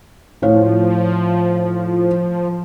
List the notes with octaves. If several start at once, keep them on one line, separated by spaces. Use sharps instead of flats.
A2 F3 C#5 F5